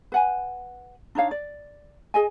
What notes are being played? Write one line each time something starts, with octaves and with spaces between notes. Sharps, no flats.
B4 F#5 G#5
D4 D#4 C#5 F5
D5
G#4 D#5 G#5